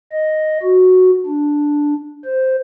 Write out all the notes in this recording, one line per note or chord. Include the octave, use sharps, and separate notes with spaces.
D#5
F#4
D4
C5